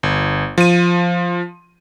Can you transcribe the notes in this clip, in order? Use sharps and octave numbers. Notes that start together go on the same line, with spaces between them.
G1
F3 D#7